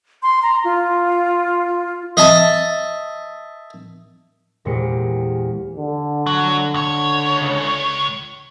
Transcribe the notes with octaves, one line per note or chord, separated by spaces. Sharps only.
C6
A#5
F4
D#5 E5 A5
E2 A#2 G#3 G4 C5 C#7
D3
F#3
C#2 C#5